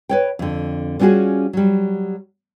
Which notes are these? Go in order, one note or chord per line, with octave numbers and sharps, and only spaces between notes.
B4 C#5 G5
F2 D3
G3 B3 C#4 F4 F#4 G#4
F#3 G3